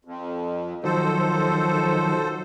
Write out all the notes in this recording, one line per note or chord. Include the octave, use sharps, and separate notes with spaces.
F2
D#3 F3 F#3 A4 C5